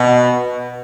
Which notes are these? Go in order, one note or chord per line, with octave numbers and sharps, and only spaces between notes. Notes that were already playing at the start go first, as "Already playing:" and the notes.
Already playing: B2